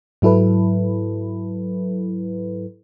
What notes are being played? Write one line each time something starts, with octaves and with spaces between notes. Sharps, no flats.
G#2 F#3 E4 A4 B4